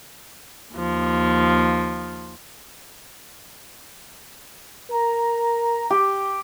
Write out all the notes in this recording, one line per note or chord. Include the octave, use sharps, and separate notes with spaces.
D#2 F3
A#4 A#5
G4